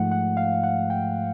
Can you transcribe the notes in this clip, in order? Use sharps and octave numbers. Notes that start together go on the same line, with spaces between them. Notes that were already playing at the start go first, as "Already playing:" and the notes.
Already playing: G#2 F3 A3 F#5
F#5
F5
F#5
G5